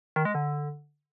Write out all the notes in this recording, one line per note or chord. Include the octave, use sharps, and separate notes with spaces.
D#3
G#3
D3